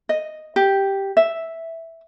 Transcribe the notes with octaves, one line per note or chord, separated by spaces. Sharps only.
D#5
G4
E5